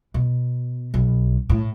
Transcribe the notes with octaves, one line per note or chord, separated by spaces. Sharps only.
B2
B1
A2